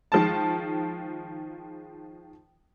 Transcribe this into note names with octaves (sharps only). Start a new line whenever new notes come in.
D#3 F3 G#3 A5